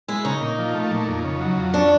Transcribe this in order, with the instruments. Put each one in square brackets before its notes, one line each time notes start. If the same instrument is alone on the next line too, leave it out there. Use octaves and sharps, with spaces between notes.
[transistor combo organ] G#3 [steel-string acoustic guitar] E4
[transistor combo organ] C#3 [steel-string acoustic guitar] D#4
[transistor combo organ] A#2
F3
A3
A#2
F2
C#3
F#3
F2
[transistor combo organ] C#4 [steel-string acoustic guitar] D4